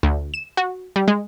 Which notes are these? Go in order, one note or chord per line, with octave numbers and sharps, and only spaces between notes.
D2
E7
F#4
G3
G#3